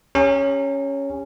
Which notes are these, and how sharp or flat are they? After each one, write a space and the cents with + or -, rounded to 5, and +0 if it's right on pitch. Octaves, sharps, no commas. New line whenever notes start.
C#4 +0 G4 +45 A#5 -30